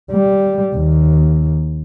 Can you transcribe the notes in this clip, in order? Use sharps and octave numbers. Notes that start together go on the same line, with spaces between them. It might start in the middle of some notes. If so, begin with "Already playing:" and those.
G3
D#2